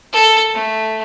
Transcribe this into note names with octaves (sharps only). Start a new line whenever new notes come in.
A4
A3